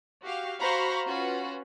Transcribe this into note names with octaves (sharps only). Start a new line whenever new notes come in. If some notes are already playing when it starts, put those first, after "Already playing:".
F#4 G4 F5
F#4 C5 F5 A#5 B5 C#6
C#4 F4 F#4 B4